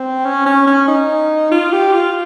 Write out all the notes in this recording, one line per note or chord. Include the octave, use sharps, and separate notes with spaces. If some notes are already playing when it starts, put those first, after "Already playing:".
Already playing: C4
C#4
C#4
C#4
D#4
F4
G4
F4